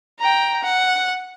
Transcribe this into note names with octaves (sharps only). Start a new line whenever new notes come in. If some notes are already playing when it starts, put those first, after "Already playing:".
G5 A#5
F#5